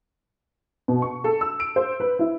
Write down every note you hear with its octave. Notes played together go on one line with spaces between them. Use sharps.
B2
C#6
A4
E6
D7
C5
B4
E4